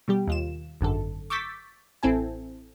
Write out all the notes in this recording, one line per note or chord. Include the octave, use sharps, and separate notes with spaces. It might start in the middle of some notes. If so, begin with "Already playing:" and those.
B2 G3 G4
D#2 F4 E7
G#1 F#2 D3 A4
C#6 D6 E6 G6 A6 B6
A1 C4 E4 A4 G#5